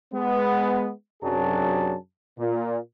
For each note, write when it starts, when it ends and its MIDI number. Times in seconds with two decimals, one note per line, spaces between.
0.13 0.90 56
0.13 0.90 59
1.23 1.95 42
1.23 1.95 48
1.23 1.95 54
1.23 1.95 62
1.23 1.95 68
1.23 1.95 81
2.38 2.77 46